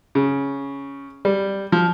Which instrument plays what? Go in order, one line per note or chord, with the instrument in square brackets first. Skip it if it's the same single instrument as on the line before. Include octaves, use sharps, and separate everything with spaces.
[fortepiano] C#3
G3
F3